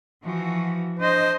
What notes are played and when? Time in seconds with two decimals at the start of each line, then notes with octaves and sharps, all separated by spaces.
0.24 E3 F3 F#4
1.00 D4 C5 D#5